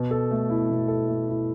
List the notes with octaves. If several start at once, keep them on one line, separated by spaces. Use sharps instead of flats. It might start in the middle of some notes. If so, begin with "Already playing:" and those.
Already playing: B2
A4
A3
E4
B2
A4
A3
E4